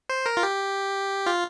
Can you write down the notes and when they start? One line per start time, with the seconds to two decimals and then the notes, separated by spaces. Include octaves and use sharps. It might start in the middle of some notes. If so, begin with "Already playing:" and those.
0.09 C5
0.26 A#4
0.37 F4
0.43 G4
1.26 F4